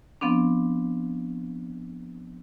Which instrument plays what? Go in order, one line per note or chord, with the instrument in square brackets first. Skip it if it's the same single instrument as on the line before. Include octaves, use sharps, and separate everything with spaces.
[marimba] F3 B3 C4 D4